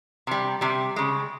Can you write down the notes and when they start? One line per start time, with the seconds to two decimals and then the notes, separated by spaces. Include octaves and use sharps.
0.27 C3 G3
0.61 C3 G3
0.96 C#3 G#3